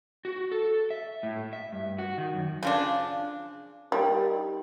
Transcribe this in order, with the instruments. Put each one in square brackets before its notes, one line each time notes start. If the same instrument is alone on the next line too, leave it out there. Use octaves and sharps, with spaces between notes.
[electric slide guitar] F#4
A4
E5
A2
E5
G2
F#4
D#3
F#2
[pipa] C#3 F3 D4
[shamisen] G3 [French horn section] D#4 G4 A#4